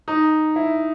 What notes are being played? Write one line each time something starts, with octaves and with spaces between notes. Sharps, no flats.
D#4
E4